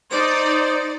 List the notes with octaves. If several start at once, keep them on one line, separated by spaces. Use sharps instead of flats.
D#4 C5 D5